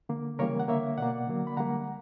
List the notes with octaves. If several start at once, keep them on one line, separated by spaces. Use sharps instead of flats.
D3 A#3
C#3 E3 G3 A#3 A#4 C#5
F#5
D3 A#3 C#5 E5
B2 A#3 D5 F#5
D3 F#3 A#3
B5
D3 G3 A#3 F#5 A#5